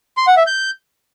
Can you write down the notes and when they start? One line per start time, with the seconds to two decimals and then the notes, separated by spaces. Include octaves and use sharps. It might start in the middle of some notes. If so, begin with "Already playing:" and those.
0.17 C6
0.27 F#5
0.37 E5
0.47 G6